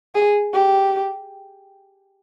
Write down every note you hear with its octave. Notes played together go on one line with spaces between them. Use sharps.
G#4
G4